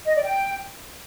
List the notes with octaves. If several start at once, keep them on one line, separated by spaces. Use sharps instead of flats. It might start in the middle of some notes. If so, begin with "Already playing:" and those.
D#5
D5
G5